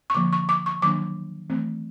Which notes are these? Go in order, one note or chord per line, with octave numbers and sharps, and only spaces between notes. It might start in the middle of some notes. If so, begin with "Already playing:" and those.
C#6
D3 F3 A#3 D6
C#6
D6
C#6
D#3 F#3 A#3 D4 D6
E3 A3 C4